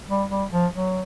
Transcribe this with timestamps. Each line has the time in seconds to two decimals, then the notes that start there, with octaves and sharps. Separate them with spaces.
0.09 G3
0.30 G3
0.52 F3
0.73 F#3